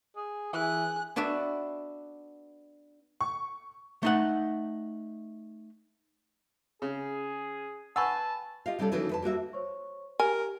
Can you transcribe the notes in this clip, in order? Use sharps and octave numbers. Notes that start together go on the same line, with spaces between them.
G#4
E3 G#4 F#6
B3 D4 F#4 D5 E5
C#6
A3 D#4 F#5
C#3 G#4
B4 F#5 G#5 A5 B5 C#6 E6
F4 G4 D#5 F5
C3 G3 A3 C#4 D4 A4
D#3 E3 F#3 A3 A#3 C#4
F2 B4 A5
G3 A#3 F#4 E5
C5 C#5 C#6
G4 A#4 G#5